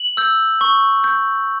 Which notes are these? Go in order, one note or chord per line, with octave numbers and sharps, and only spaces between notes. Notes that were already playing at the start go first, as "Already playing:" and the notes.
Already playing: F#7
E6 G6
C#6
G6